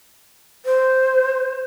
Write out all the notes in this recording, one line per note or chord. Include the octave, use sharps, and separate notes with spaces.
C5